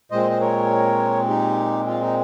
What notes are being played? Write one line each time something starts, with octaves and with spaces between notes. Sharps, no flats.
A#2 G#3 C4 C5 D#5
C5
A#4 C#5
D#4 G4
F4
D#4